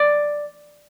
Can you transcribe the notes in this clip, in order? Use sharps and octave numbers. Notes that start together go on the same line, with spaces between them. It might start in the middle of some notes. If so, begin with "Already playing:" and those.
Already playing: D5